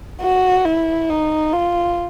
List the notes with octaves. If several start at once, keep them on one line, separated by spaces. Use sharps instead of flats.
F#4
E4
D#4
F4